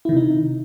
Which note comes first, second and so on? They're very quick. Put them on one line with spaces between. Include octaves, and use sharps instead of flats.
E4 D#3 C3 D#4